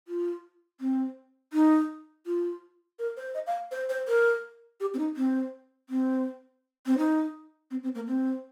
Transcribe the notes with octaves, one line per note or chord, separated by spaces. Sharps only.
F4
C4
D#4
F4
A#4
C5
D#5
F5
C5
C5
A#4
G4
C4
D#4
C4
C4
C4
D#4
C4
C4
A#3
C4